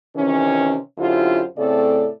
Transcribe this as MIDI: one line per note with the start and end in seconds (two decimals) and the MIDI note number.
0.15 0.76 48
0.15 0.76 51
0.15 0.76 52
0.15 0.76 61
0.98 1.43 42
0.98 1.43 50
0.98 1.43 64
0.98 1.43 65
0.98 1.43 67
0.98 1.43 72
1.57 2.08 45
1.57 2.08 49
1.57 2.08 57
1.57 2.08 60
1.57 2.08 69
1.57 2.08 74